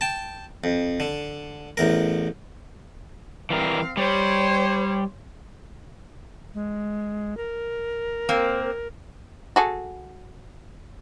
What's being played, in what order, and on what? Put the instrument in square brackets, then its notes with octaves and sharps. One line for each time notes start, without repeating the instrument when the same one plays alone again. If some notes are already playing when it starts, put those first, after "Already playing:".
[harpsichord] G5 A5
F2
D3
A1 E2 A#4
[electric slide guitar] E3 G3 A#4 [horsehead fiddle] C4 F5
[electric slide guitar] G3 [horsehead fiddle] C5 C#5
[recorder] G#3
A#4
[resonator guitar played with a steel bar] A#3 C4
[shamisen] F#4 G#4 A4